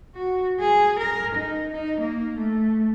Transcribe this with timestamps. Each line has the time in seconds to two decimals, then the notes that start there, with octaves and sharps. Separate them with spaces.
0.15 F#4
0.61 G#4
0.99 A#4
1.36 D#4
1.72 D#4
2.00 A#3
2.37 A3